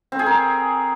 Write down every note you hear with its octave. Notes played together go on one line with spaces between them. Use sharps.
C4
G#4
A#4